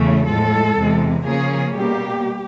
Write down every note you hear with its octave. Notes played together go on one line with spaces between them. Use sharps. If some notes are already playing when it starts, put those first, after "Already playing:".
Already playing: E2 C#3 E3 A3 C#4
A2 F3 G#3 A4
E2 C3 E3 G#3
C#3 F3 A#3 C#4 G#4
B2 G3 A#3 G4